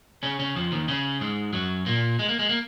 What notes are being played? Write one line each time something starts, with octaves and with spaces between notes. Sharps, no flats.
C#3 C#4
C#3 C#4
F2 F3
D#2 D#3
C#3 C#4
G#2 G#3
F#2 F#3
A#2 A#3
G#3
A#3
G#3
A#3